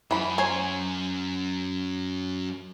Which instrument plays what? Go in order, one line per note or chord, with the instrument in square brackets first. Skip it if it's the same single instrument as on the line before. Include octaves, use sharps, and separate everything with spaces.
[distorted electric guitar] F#2 [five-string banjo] E3 B5
[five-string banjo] C5 C#5 G#5